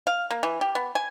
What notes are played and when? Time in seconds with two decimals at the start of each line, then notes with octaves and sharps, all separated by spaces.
0.07 F5
0.31 A#3
0.43 E3
0.61 G4
0.75 B3
0.95 G#5